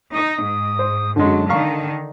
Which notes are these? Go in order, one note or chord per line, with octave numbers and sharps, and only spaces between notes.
D#4 D#6
G#2
C5
F#2 D3 F#3 G#3 A5
D3 D#3 F5 A#5 C#6